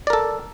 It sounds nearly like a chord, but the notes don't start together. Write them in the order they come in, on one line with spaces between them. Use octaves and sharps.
D5 A#4 A4